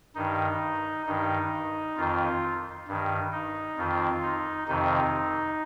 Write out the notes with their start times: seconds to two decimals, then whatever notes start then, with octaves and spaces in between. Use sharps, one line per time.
0.15 G2 D#3 D#4
1.06 G2 D#3 D#4
1.97 F2 D#3 F4
2.88 G2 D#3
3.32 D#4
3.77 F2 D#3 F4
4.23 D#4
4.67 F2 C3 D#3 D#4